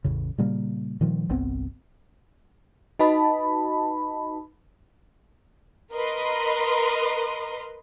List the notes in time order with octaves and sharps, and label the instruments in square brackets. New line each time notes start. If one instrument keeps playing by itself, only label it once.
[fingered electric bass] A1 E2 C#3
A#2 C#3 G3 A#3
A#2 D#3 F3 G3
G1 C2 B3 C4
[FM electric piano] D#4 F#4 B4 D#5 A5 B5
[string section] A#4 B4 D#5 C6